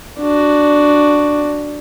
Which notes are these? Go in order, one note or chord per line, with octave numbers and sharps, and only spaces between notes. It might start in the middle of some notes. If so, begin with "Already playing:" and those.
D4 F#4